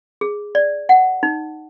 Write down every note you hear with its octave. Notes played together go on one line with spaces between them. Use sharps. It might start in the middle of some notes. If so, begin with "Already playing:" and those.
G#4
D5
F#5
D#4